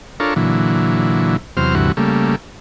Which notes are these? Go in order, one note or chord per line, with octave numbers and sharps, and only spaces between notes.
D4 F4 A4 A#4 C#5
A#2 D3 E3 F#3
E2 C3 F#3 C5 F6
D2 G2 C3 E3 F#4
C#3 G3 A3 A#3